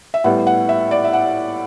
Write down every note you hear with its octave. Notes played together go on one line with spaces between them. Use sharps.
E5
A2 G3 B3 E4 F#5
F#5
E5
D5
E5
F#5